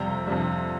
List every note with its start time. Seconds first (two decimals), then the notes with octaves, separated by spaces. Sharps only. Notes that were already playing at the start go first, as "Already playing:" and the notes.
Already playing: F2 C3 G3 G5 A#5
0.27 F2 C3 G3